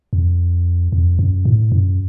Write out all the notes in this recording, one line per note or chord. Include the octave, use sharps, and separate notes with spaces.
F2
F2
F#2
A2
F#2